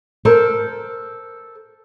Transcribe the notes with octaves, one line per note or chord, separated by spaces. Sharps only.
A4 A#4 C5